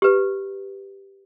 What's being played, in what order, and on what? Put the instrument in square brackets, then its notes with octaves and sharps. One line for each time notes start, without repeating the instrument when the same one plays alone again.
[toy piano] G4 B4